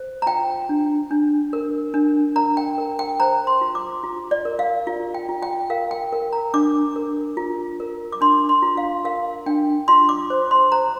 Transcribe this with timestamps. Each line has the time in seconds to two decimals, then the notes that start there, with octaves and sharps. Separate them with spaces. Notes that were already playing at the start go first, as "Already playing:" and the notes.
Already playing: C5
0.22 A#5
0.26 F4 G5
0.69 D4
1.11 D4
1.53 A#4
1.94 D4
2.36 A#4 A#5
2.57 G5
2.78 A#4
2.99 G5
3.20 C5 A#5
3.47 C6
3.61 F4
3.75 D6
4.03 F4
4.31 D5
4.45 A#4
4.59 F5
4.87 F4
5.14 G5
5.29 F4
5.43 G5
5.70 A#4 F5
5.91 G5
6.13 A#4
6.32 A#5
6.54 D4 D6
6.96 A#4
7.37 F4
7.80 A#4
8.12 D6
8.21 D4 C6
8.49 C6
8.62 F4
8.77 F5
9.05 A#4 F5
9.46 D4 G5
9.88 F4 C6
10.09 D6
10.30 C5
10.51 C6
10.72 C5 A#5